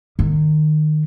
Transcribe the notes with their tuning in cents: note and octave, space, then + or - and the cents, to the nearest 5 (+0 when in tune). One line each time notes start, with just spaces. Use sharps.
D#3 -25